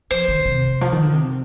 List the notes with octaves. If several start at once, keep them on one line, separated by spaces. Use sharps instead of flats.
F3 C5
D#3
C3
F3
D#3
D3
C3